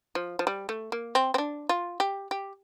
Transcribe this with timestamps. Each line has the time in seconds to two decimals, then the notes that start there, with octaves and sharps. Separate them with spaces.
0.15 F3
0.39 F3
0.47 G3
0.69 A3
0.92 A#3
1.15 C4
1.34 C4
1.38 D4
1.69 F4
2.00 G4
2.31 G4